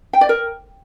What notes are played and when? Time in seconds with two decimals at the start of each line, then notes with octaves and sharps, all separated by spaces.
0.13 G5
0.21 D5
0.29 A#4